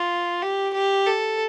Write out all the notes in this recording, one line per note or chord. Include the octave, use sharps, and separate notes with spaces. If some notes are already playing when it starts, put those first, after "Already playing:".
Already playing: F4
G4
G4
A4